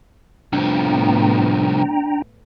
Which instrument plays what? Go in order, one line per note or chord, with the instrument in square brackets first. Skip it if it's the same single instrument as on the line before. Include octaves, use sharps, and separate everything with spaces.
[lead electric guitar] C2 F3 [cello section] A2 B3 [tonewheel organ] D4 G5 A#5